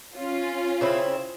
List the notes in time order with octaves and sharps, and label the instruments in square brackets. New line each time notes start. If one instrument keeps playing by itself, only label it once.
[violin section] C#4 F4
[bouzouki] C#3 C4 E4